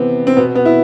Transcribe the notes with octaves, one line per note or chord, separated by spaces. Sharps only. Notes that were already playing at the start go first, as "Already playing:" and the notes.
Already playing: C3 E3 B3 C4
C4
B2 B3
B3
E4